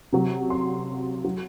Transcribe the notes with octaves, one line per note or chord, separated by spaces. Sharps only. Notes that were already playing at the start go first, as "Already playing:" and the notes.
C3 F#3
C6
F#3